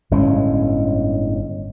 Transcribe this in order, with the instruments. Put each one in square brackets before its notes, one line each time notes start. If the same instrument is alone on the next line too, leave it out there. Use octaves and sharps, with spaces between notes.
[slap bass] G1 A2 G#3 C#4